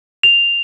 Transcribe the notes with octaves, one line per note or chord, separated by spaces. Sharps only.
F7